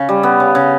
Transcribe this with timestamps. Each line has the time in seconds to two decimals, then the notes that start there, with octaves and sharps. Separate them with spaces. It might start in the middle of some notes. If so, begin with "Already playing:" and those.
Already playing: C#3
0.09 G3
0.23 B3
0.40 C#3
0.55 C#3